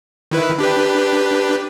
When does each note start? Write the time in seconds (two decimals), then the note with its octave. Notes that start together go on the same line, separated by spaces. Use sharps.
0.31 D#3 E4 B4
0.58 D4 G4 B4